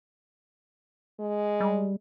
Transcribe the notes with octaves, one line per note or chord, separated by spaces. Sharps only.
G#3
G3